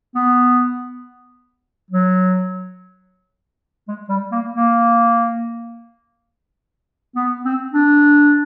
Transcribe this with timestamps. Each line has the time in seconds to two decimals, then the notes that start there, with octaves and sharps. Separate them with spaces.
0.15 B3
1.90 F#3
3.88 G#3
4.09 G3
4.32 A#3
4.54 A#3
7.15 B3
7.45 C4
7.73 D4